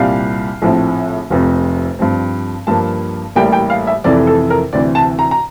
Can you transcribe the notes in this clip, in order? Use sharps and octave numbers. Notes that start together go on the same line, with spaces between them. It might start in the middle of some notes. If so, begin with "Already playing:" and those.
Already playing: C2 A#2 G3 C4 F5
A#1 A2 F3 C4
F1 F2 C3
G2 F3 C4
G2 F3 A#3 A5
A1 A2 G3 A#3 G5
G5
F5
E5
F2 C3 E3 A3 D5
A4
A#4
D2 C3 E3 D5
A5
A#5
A#5